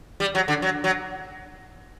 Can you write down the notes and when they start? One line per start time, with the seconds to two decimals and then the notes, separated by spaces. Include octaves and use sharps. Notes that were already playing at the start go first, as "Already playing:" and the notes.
0.20 G3
0.35 F#3
0.48 D3
0.62 F#3
0.84 F#3